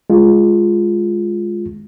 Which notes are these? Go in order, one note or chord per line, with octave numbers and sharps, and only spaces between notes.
G#3 F4